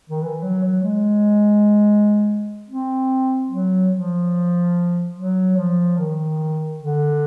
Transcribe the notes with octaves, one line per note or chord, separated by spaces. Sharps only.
D#3
E3
F#3
F#3
G#3
C4
F#3
F3
F#3
F3
D#3
D3